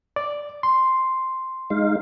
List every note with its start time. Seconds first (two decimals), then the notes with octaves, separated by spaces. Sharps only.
0.16 D5
0.63 C6
1.70 G#3 D#4 F5